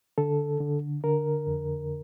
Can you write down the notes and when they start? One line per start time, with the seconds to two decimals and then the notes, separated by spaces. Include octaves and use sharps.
0.18 D3 A4
0.60 D3
1.04 D3 A#4
1.47 F2